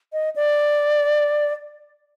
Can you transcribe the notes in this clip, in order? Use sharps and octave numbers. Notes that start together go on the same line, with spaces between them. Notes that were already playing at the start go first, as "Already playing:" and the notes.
D#5
D5